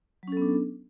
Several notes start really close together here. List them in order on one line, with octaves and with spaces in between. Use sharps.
F#3 C#4 A4 B3 D4